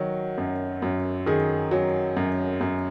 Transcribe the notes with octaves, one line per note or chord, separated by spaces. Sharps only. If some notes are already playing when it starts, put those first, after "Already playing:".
Already playing: D#3 F#3 F#4
F#2
F#2
D#3 G#4
F#3
F#2
F#2